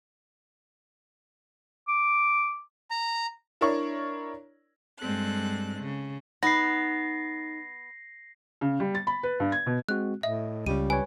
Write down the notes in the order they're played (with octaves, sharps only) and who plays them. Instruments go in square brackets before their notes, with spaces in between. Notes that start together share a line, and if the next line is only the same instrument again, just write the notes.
[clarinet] D6
[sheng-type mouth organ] A#5
[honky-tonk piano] D4 E4 A#4 C#5 D5 C#6
[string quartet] G2 G#3 C4 A4 F#6
C#3
[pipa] B3 [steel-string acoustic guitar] D#4 [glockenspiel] A#6 C7
[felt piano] C#3
G3
A6
B5
B4
G2
G#6
B2
[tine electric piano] G#3 C4 F#4 [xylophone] F#6
[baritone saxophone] A2 [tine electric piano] D#5 [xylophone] E5
[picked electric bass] C#2 C#3 [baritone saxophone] G3 [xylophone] D#7
[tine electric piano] B4 C#5 [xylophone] G#5